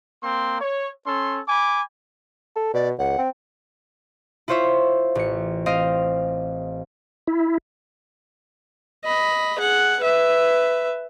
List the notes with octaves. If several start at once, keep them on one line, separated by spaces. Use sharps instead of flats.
A#3 C4 C6
C#5
C#4 A4 C6
G#5 B5 D6
A4
B2 D5
C#2 F#5
C4
E4 F4 C5 C#5 E5
A1 C#7
C4 D#5 F5
E4
D#5 B5
G#4 F#5
B4 E5